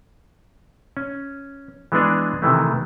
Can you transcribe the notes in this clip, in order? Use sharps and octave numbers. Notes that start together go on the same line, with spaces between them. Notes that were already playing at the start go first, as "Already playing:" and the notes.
C#4
E3 G#3 B3 D4 G#4
C3 D#3 E3 A3